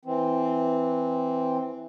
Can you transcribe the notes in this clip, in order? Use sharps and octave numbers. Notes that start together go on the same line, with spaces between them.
E3 C4